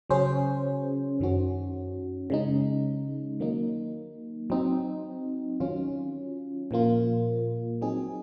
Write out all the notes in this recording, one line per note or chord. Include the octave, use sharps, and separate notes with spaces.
C#3 F#3 C#4 G#4 C5
F#2 D#3 F#3 C#4 F#4
C#3 G#3 D#4
D#3 F#3 A#3 D#4
F#3 C4 D#4
D#3 F#3 C#4 F4
A#2 F3 A#3 F4
F#3 C4 D#4 G#4